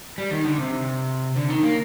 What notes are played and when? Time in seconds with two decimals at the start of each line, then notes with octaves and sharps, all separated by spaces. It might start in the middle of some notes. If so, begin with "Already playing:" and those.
0.18 G3
0.31 D#3
0.45 D3
0.58 C3
1.36 D3
1.50 D#3
1.63 A#3